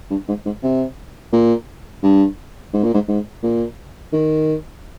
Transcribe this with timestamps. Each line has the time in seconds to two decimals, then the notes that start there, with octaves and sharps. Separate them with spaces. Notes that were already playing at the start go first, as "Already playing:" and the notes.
0.10 G2
0.28 G#2
0.45 G#2
0.63 C3
1.33 A#2
2.03 G2
2.73 G#2
2.84 A#2
2.94 G#2
3.08 G#2
3.43 A#2
4.13 D#3